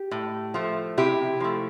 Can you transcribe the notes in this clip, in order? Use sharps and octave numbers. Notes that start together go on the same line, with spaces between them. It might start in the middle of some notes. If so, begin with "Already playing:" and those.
Already playing: G4
A2
F3 A3
C3 E4 G4
F3 A3